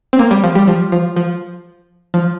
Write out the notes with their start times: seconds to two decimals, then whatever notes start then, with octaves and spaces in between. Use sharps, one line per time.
0.13 C4
0.19 A#3
0.31 G3
0.44 F3
0.55 G3
0.67 F3
0.92 F3
1.16 F3
2.14 F3